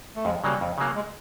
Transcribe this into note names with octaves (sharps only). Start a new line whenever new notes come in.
A3
F2 G#3
C#3 F#3 G3 A#3
F2
C#3 F#3 A#3
G#3